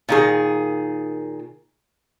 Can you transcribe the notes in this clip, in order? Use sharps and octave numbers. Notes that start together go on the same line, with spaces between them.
A#2 D#3 G#4